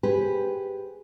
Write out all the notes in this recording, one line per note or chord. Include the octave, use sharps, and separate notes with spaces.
G4 G#4 B4 C5